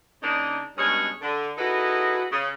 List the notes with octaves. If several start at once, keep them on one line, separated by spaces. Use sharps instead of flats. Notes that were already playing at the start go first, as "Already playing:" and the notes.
C#3 A#3 D4 D#4
G2 B2 G#3 C#4 G#4 C#5
D3
D#4 E4 F#4 G#4 A4 B4
C#3